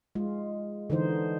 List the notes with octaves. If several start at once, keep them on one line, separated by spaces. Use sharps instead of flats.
G#3 F4
D3 E3 D#4 C5